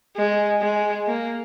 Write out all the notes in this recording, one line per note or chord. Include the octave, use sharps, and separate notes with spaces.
G#3
G#3
A#3